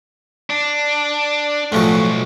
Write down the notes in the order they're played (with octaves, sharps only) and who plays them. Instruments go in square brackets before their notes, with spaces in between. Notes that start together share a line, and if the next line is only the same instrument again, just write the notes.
[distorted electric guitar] D4
[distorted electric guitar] B1 [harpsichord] A2 F3 F#4